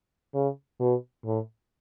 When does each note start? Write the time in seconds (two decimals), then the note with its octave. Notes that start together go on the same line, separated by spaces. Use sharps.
0.34 C#3
0.80 B2
1.25 A2